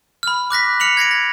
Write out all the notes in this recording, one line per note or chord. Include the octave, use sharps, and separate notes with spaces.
B5 F6
D6 F#6 A#6 B6
F6 C#7 F7 F#7
G#6 A#6 C7 D7
A#6